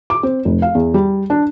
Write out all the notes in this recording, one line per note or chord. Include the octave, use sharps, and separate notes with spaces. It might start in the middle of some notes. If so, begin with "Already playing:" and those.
D6
C4
F1
F5
E2
G3
D4